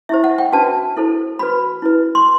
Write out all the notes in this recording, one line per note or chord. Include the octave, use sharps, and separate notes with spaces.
E4 G4 C5 E5
F#5
G5
D4 F#4 B4 A5
E4 A4 C5
F#4 B4 B5
E4 B4
C6